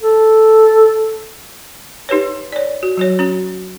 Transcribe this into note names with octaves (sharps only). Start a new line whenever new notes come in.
A4
D#4 G4 B4 C#5
C#5 D5
F#4
F#3 F#4 C#5
C#4 F#4